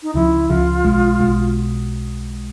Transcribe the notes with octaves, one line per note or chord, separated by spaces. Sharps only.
D#4
C#2 C#3 F3 E4
C#2 C#3 F3 F4
B1 B2 G#3
B1 B2 G#3